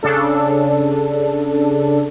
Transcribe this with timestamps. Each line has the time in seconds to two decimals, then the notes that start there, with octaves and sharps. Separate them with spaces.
0.03 C#3 D4 A4